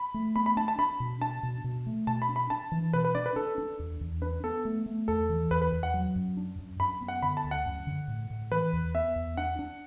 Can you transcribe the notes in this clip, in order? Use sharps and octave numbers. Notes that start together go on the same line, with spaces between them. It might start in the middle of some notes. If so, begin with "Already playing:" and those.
Already playing: B5
A3
B3 B5
B5
D4 A5
A5
D4 B5
B2
D4 A5
B2
B2
A3
B2 A5
B5
D4
B5
D4 A5
E3
B2 B4
B4
D4 D5
B4
D4 A4
D4
E2
E2
D4 B4
B3 A4
A3
A3
E2 A4
E3
E2 B4
B4
E2
F#5
F#3
F#2
D4
F#2
F#2 B5
B3
F#5
D3 B5
A5
D2
F#5
F#2
D3
A2
A2
E3 B4
E2
B3 E5
E2
D4 F#5
D4